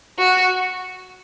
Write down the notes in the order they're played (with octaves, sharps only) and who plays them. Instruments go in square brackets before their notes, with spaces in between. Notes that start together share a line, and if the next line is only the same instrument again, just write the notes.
[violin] F#4